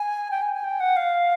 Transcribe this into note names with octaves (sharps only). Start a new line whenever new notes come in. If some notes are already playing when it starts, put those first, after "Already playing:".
Already playing: G#5
G5
G#5
G#5
G5
F#5
F5